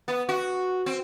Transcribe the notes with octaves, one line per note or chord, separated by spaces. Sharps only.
B3
F#4
C4